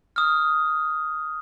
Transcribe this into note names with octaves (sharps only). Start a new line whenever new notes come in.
D#6 F6